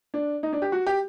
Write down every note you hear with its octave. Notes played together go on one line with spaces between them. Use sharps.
D4
D#4
D4
G4
F#4
G4